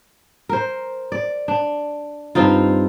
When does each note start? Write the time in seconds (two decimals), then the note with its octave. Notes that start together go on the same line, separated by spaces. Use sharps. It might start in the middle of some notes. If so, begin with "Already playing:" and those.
0.49 A#4 C5
1.12 D5
1.48 D4
2.35 G2 C4 D#4 F4